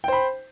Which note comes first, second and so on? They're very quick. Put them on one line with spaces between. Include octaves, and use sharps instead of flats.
G5 C5 B5